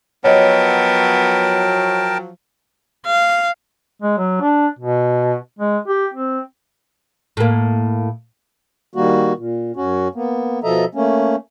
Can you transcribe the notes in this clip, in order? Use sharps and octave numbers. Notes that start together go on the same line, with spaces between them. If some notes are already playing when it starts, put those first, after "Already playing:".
F3 F#3 B3 A#4 C#5 D#5 G5 A5
F5
G#3
F#3
D4
B2
G#3
G4
C4
A2 A#3
D#3 G3 A#3 F#4
A#2
F#2 C#4 F#4
A#3 B3
B2 F3 A4 D#5 E5 A#5
A3 A#3 C#4